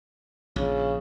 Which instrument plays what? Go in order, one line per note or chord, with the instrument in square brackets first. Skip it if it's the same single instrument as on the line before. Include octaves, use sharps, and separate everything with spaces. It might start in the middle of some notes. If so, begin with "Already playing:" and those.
[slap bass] A#1 [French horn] C#3